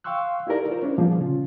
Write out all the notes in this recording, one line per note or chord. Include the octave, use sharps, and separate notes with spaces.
F5 G5 C6 C#6 E6 F#6
D#4 E4 G4 A4 A#4 D5
F4 A#4 C5
C#4 D4 E4
A#2 F3 G3 A#3 B3 G#4
C#3 C#4 F4